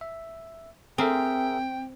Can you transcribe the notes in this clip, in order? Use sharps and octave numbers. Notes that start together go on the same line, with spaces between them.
E5
C4 G#4 A#4 E5 G5